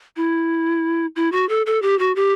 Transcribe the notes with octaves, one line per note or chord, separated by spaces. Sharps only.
E4
E4
F#4
A4
A4
G4
F#4
G4